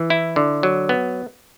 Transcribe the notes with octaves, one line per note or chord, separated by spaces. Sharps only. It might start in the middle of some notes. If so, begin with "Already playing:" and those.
Already playing: E3
E4
D3
F#3
B3